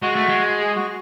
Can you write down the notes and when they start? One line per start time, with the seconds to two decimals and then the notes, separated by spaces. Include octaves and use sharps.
0.02 G#3 F#4
0.15 A3
0.29 G#3
0.61 G#4
0.76 F#4